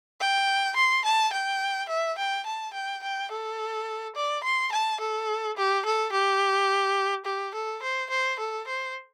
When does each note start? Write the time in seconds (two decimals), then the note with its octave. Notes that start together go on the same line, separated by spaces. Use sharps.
0.21 G5
0.76 C6
1.05 A5
1.33 G5
1.89 E5
2.18 G5
2.46 A5
2.74 G5
3.03 G5
3.31 A4
4.16 D5
4.44 C6
4.72 A5
5.00 A4
5.57 G4
5.85 A4
6.12 G4
7.26 G4
7.54 A4
7.83 C5
8.10 C5
8.39 A4
8.67 C5